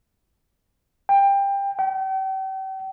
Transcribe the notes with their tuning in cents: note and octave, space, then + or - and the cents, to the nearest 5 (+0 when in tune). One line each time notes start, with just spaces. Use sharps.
G5 +20
G5 -40